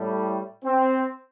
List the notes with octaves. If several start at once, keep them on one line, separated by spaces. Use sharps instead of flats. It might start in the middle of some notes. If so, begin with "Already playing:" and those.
Already playing: A2 G3
C4